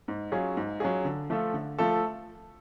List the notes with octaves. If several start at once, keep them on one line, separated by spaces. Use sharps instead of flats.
G#2
F#3 C#4 F4 G#4
G#2
F#3 C#4 F4 G#4
D3
F3 A3 F4 A4
D3
F3 A3 F4 A4